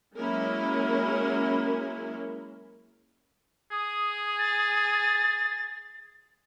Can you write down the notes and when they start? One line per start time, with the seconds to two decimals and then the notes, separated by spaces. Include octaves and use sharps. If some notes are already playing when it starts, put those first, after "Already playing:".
0.16 F#3 G#3 A#3 C#4 E4 A#4
3.71 G#4 D#6
4.39 A6